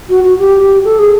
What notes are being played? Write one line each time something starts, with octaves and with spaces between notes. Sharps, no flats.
F#4
F#4
G4
A4
G#4